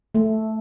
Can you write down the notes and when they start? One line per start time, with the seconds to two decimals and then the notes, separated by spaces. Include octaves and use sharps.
0.15 A3